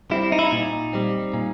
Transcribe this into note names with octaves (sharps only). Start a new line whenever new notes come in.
G3 C4 E4
D#4
E4
D#4
A#2
G3 C4
A#2